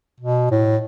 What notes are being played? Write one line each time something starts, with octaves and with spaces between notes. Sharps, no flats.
B2
A2